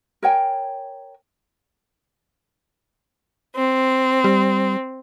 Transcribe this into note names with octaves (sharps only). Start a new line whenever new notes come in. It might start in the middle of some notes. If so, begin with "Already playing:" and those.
A#4 C#5 G5 G#5
C4
G3